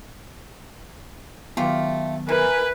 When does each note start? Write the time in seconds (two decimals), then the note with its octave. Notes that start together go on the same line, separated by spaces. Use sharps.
1.57 D#3 F#3 A3 B3 F4 G4
2.29 E3 A#4 B4 G#5